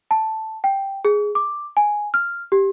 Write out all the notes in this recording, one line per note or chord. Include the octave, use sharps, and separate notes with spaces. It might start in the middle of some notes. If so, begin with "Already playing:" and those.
A5
G5
G#4
D6
G#5
F6
G4